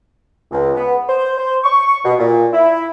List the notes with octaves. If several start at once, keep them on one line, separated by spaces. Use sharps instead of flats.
C#2
B3
C5
C5
C#6
B2
A#2
E4